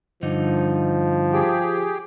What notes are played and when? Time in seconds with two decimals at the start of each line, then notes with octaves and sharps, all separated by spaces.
0.22 G2 D3 F3 D#4
1.33 G4 G#4 G5